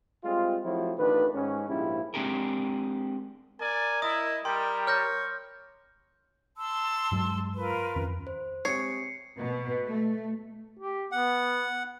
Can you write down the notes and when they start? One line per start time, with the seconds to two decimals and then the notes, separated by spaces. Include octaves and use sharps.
0.23 G3 G#3 C4 F4
0.64 F3 F#3 A3 C4 E4
0.98 A1 D#3 D4 F4 B4
1.33 G#2 G#3 C#4
1.68 A#1 G#2 F3 G3 E4
2.14 G#3 C4 D4 G4 G#4 A#4
3.60 A#4 D5 G#5
4.02 E4 D#5 D#6
4.45 G3 A#4 G5 C6
4.87 C#5 F6 G6 A#6
6.58 A5 C6 E6
7.12 G2 F#3 G#3
7.56 F4 A#4 B4
7.96 F2 D#3 C#4
8.27 C5
8.65 C3 G#3 C#5 C7 C#7
9.39 B2
9.84 A3
10.79 G4
11.12 B3 F#5